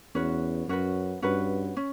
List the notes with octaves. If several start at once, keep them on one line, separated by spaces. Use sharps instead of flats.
E2 C#4 F#4 B4
F#2 C#4 F#4 B4
G2 C#4 F#4 B4
C#4